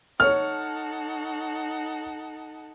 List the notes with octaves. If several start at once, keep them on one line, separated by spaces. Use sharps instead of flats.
D#4 A4 C#5 F#5 F6